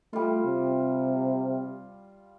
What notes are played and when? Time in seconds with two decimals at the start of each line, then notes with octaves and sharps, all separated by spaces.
0.13 G3 A3 F4
0.46 C3